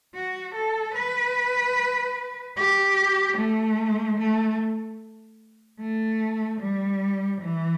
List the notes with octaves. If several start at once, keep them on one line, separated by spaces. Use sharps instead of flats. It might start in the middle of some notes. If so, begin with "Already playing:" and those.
F#4
A4
B4
G4
A3
A3
A3
G3
E3